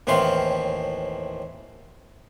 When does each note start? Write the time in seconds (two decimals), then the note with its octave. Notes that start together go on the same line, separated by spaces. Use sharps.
0.07 D#2 A2 E3 C4 F5 C6